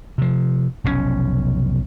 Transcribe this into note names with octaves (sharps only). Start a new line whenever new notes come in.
C3 F3
F1 B1 A#2 C#4